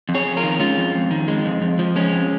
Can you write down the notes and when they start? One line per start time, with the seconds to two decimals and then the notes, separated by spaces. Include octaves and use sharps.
0.09 F2
0.14 G#4 C#5
0.26 F2
0.37 F4 A#4
0.43 D#3
0.60 G#3 C#4 F4
0.77 F2
0.94 F2
1.11 D#3
1.28 G#3
1.45 F2
1.62 F2
1.79 F3
1.96 G#3 C#4
2.13 F2